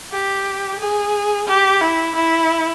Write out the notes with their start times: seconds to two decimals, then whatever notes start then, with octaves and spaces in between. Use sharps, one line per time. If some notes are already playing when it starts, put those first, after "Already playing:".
0.12 G4
0.79 G#4
1.47 G4
1.81 E4
2.15 E4